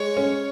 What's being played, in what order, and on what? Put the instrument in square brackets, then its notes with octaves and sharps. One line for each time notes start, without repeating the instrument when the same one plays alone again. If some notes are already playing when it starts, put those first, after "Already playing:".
Already playing: [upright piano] G#3 [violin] C#5
[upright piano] C#4